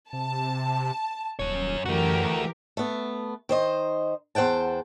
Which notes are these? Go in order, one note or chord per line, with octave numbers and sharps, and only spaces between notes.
C3 A5
D#1 F#2 C#5
F#2 E3 A3 F#4 G4 A#4
A3 B3
D#3 C5 D#5
E2 C5 F#5 G5 A5